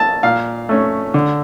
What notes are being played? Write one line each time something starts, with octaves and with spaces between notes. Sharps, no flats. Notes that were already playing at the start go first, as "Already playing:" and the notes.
Already playing: A5
A#2 F5
A3 C#4
D3